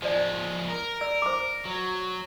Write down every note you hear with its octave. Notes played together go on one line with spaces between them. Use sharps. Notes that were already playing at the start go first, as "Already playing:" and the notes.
F3 G#3 C5 D5
A#4
D5 E6
C5 D6
F#3